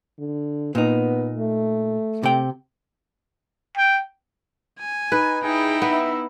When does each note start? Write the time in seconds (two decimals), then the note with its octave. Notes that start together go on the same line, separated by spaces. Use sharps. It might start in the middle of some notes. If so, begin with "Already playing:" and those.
0.18 D3
0.75 A#2 B3 D#4
1.38 A3
2.23 C3 G5
3.77 G5
4.79 G#5
5.12 D#4 B4
5.44 D#4 E4 G#4 G5
5.82 B3 E5